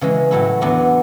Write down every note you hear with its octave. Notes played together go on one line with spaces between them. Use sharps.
C#3 E3 G#3
A2 F#3 A3 E4
E2 D3 F#3 B3 D4